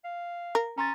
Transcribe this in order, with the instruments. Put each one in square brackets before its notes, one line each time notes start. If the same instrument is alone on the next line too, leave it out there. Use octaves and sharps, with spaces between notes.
[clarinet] F5
[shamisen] A#4
[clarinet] C#4 [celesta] A#5 C6 A6